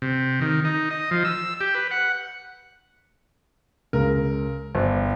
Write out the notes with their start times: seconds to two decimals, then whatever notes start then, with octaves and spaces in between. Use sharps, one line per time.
0.02 C3
0.41 D#3
0.64 D#4
0.91 D#5
1.11 F3
1.25 E6
1.61 G4
1.75 B4
1.91 F#5
3.93 C#2 A#4
4.75 G1 C5 D5